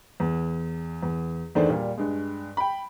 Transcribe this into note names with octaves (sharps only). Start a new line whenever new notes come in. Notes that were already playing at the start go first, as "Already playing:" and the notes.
E2
E2
E2 D#3 A3 D4 C5
A#2 G3
G2 G#3
G5 B5